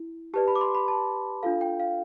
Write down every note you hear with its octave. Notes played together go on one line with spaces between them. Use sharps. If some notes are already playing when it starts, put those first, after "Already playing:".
Already playing: E4
G4 B4 D5 A5
B5
D6
C6
B5
A5
D4 F4 A4 F5
G5
F5